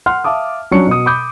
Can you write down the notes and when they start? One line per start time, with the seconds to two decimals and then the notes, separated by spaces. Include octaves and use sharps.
0.06 F#5 C6 F6
0.24 E5 F5 A5 D6 D#6
0.71 F#3 C#4 D4 C#6 C#7
0.87 B2 D#6
1.06 B5 D6 D#6 G6